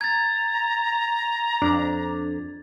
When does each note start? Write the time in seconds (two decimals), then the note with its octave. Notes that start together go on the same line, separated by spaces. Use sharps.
0.01 A#5 G#6 A6
1.62 F2 D4